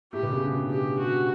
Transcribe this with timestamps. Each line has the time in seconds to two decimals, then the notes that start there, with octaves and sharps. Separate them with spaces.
0.13 A2 A3 G4
0.23 B2 B3
0.32 C#3 C#4
0.41 D3 D4
0.71 G4
0.99 F#4